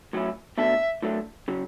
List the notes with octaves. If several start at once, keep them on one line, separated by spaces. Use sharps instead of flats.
A2 F#3 C#4 E4
B2 A3 D4 A4 E5
A2 F#3 A3 D4
C#3 F#3